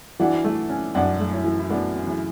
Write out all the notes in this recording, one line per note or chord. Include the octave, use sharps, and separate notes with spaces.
E3 D4 F#4
A3
C#4
F#2 D4 F#4
A3
C#4 E4
E3
E4
A3 B3 D4
C#4
C#3 E3